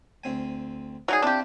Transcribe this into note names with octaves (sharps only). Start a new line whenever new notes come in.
D2 C4 G#5
F#3 D#4 G#4 D5 A#5 C#6
C4 D4 E4 F4 G4